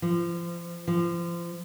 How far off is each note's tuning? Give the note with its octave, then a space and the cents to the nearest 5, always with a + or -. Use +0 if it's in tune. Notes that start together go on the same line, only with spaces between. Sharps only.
F3 -30
F3 -30